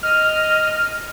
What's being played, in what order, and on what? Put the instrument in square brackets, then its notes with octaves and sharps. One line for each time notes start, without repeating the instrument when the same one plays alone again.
[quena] D#5 [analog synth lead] F6